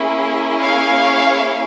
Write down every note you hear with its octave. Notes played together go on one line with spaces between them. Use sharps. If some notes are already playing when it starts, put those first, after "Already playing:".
Already playing: A#3 C#4 E4 G#4
C#5 F5